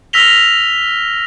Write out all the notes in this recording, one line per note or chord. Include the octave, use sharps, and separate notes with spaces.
E6 F6 A#6 B6 F7 G7